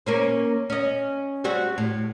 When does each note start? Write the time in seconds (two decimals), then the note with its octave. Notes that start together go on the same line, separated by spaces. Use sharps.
0.06 A#3 C#4 C5
0.70 C#4 D#5
1.44 G3 C4 F#4
1.78 A2